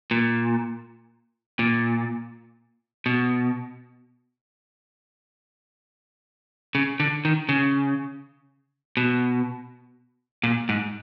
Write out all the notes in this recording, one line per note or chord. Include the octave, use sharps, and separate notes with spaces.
A#2
A#2
B2
C#3
D3
D#3
C#3
B2
A#2
G#2